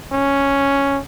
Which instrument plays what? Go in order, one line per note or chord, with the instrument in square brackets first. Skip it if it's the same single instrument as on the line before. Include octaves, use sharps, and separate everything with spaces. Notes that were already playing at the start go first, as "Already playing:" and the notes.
[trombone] C#4